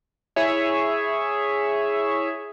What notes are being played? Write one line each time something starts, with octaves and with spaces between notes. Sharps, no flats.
E4 G#4 C#5 E5